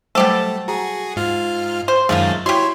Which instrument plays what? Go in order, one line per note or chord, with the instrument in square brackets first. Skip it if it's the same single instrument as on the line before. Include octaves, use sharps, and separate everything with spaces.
[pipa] B2 G4 A4 [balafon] F#3 G3 C5 [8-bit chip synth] A3
[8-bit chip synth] F#4 G#4 [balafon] A#5
[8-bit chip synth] G#2 F4 F6
[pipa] C5
[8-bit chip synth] F#2 D#3 G#3 [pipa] F3 A3 F4
[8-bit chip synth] E4 C#5 [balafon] F#4 [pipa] G4 C6